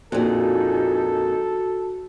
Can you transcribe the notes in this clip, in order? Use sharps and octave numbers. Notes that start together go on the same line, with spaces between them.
F2 A#2 D4 D#4 F#4 G#4 A4